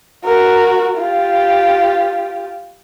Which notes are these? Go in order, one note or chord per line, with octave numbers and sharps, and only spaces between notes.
F#4 A#4
F4 G4